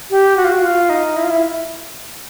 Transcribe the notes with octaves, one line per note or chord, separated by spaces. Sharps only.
G4
F#4
F4
F#4
F4
D#4
E4
F4
E4